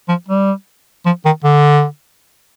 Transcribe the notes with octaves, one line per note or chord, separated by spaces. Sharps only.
F3
G3
F3
D#3
D3